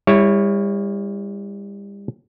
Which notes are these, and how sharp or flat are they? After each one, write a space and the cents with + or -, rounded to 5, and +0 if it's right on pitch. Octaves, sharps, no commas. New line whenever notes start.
G3 +35 E4 +0 C#5 +0